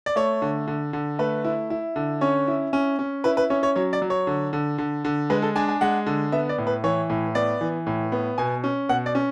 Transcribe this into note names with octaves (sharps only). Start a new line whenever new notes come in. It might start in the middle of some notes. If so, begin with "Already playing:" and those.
D5
A3 C#5
D3
D3
D3
A3 B4
E4
E4
D3
C#4 C#5
E4
C#4
C#4
E4 B4
B4
C#4 C#5
C#5
F#3 C#5
D5
F#3
C#5
D3
D3
D3
D3
G#3 B4
A4
D4 G#5
G#5
G#3 F#5
D3
B3 E5
D5
A2
B4
E3 C#5
A2
B3 D5
E3
A2
B3
B2 G#5
C#4
B2 F#5
D5
C#4